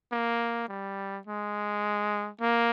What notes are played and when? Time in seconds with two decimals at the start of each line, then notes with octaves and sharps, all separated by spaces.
0.12 A#3
0.68 G3
1.27 G#3
2.41 A#3